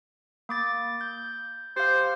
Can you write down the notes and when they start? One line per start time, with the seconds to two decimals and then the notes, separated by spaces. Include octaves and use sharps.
0.49 A#3 D6 A6
1.01 G6
1.77 G4 C5 F5